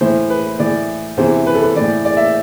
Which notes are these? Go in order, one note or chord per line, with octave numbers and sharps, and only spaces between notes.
A2 E3 C5
B4
A2 E3 D5
E2 C3 E3 C5
B4
A4
B4
A2 E3 D5
D5
E5